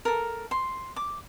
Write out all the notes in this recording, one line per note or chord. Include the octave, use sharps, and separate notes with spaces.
A4 A#4
C6
D6